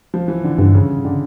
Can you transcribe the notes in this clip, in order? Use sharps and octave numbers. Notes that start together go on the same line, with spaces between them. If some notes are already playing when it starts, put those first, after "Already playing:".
F3
E3
D3
G2 D3
C#3
D3